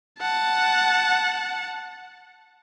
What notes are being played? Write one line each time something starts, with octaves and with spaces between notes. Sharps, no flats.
F#5 A5